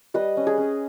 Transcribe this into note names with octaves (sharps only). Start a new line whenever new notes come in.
G3 B4 D#5
C#4
G#4
C#4